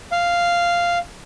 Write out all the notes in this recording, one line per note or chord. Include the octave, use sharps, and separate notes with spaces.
F5